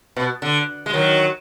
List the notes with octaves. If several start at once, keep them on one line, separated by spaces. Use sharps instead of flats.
B2
D3
G#3
D#3 F#3